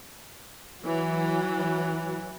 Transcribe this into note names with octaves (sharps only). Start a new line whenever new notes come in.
E3 F#3